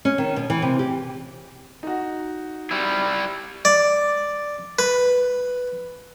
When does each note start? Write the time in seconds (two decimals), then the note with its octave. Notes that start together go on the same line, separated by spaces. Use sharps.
0.05 C#4
0.18 D#3
0.36 B2
0.50 E3
0.62 C3
0.79 G4
1.83 D#4 F#4
2.71 G3 E4
3.65 D5
4.79 B4